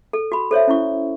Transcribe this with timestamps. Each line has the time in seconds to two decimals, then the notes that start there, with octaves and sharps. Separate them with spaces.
0.13 A4
0.32 F#4 B5
0.51 A4 C5 C#5 E5
0.67 C#4 E4 C#6